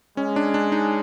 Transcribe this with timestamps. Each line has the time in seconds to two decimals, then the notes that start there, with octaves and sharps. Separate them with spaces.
0.17 G#3 C#4
0.36 D4
0.54 D4
0.72 D#4